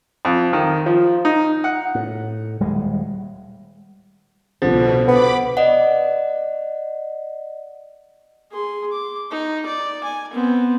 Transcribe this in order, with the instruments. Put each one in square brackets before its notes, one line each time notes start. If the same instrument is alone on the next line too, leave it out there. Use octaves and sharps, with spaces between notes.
[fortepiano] F2
D#3
F3
D#4
F#5
[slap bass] A2
D#1 G3 G#3
[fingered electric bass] D1 C2 [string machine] B2 [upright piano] D3 F3
[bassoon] B3 [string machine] B5 D6
[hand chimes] D5 D#5 F#5
[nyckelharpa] G#4 C6
D6
D#4
D5
G#5
B3 C4